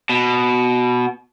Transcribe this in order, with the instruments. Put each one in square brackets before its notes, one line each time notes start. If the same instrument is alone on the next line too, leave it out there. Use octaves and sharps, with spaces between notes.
[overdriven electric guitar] B2